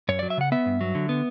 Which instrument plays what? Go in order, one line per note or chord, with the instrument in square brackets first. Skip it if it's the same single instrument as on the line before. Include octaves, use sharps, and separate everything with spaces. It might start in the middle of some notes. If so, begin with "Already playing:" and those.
[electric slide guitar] F#2 C#5
F#3 D5
E5
C#3 F#5
B3 E5
G2
F#3
D3
B3